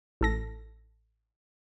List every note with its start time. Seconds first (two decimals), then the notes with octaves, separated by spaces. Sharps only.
0.21 A1 A4 A#6